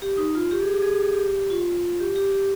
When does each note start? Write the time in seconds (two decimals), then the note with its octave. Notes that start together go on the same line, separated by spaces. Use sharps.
0.02 G4
0.17 D#4
0.35 F4
0.51 G4
0.62 G#4
0.72 G4
0.82 G#4
0.93 G4
1.03 G#4
1.14 G4
1.50 F4
2.00 G4
2.16 G4
2.32 G4